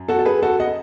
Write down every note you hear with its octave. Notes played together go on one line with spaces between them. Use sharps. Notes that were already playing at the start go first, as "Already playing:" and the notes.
Already playing: F#2
F#4 A4
A4
G#4 B4
F#4 A4
D#5 F#5